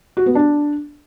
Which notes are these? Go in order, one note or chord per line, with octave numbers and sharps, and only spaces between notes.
F#4
B3
D4